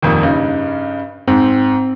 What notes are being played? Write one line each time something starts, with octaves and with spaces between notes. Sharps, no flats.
D#1 F2 D#3
G2 C#3 D#4
G#2 C4